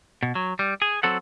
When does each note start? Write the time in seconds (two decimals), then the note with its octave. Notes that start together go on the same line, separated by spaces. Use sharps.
0.23 B2
0.35 F#3
0.59 G3
0.82 G#4
1.03 F#3 C4 A4 F#5